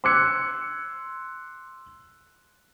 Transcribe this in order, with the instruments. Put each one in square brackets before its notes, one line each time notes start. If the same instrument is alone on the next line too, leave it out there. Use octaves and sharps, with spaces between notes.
[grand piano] C6 D6 E6 F#6 G#6 C#7